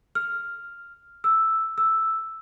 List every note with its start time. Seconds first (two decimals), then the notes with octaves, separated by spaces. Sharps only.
0.15 F6
1.24 E6
1.78 E6